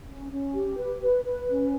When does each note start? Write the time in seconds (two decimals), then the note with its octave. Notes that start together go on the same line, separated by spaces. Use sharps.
0.08 C#4
0.31 C#4
0.54 G4
0.77 B4
1.01 B4
1.24 B4
1.48 C#4